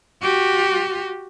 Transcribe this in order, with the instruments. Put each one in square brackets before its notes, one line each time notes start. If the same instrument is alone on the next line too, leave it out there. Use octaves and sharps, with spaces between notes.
[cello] F#4 G4